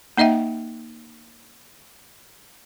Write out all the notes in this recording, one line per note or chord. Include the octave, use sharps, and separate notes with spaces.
A#3 D#4 D#5 E5 G5